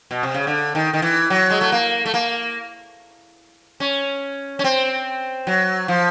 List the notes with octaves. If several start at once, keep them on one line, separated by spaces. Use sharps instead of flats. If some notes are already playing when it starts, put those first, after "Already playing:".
B2
C3
C#3
D3
D#3
D#3
E3
F#3
G#3
A3
A#3
A3
A#3
C#4
C#4
C4
F#3
F3